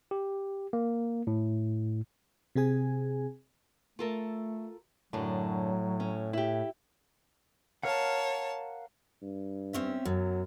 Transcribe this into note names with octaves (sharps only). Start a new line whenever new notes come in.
G4
A#3
A2
C3 C4 G#4 G#5
A3 F4 A4 A#4
F#2 A2 D3 F#3
C#4
E4 G4
A#4 C#5 F5 F#5 A5
G2
C4 C#4 E5
F#2 F#3